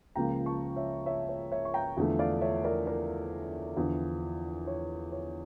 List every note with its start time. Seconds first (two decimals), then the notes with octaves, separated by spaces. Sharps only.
0.15 C#2 C#3 F3 A#3 G5 A#5
0.46 A5 C#6
0.76 C#5 E5
1.06 C#5 E5
1.29 C#5
1.52 C#5 E5
1.65 C#6
1.74 G5 A#5
1.97 E2 D3 F3 A3
2.19 D5 F5
2.41 C#5 E5
2.64 A#4 D5
2.87 A#4 D5
3.77 E2 D3 F3
4.67 C#5
5.12 C#5